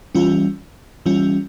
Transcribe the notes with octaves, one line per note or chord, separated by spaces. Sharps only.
E3 G3 C#4 F4
E3 G3 C#4 F4